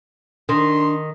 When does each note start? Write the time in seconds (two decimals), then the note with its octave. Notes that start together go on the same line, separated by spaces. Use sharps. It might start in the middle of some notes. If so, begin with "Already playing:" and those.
0.49 D#3 D4 C6